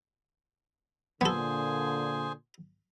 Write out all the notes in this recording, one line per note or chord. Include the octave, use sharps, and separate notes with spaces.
A#2 D3 B3 G#4 A4 C5 G#5